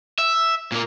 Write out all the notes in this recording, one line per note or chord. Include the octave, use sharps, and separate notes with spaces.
E5
A#2 A#3